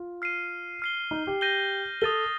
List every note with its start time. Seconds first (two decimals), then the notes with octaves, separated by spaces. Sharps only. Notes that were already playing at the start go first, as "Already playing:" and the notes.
Already playing: F4
0.22 F6 C7 D#7
0.82 F6 C7 G7
1.11 D#4
1.27 G4
1.41 G6 A#6 D#7 G7
2.01 A4 D#6 A6 D#7 G7